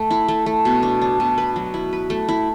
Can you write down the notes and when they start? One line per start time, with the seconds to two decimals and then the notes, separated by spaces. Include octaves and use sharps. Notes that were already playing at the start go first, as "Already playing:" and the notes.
Already playing: A3
0.11 E4
0.28 A3
0.46 A3
0.65 B2
0.83 D4
1.02 D4
1.20 B2
1.38 B4
1.56 F#3
1.74 E4
1.93 B4
2.10 A3
2.29 E4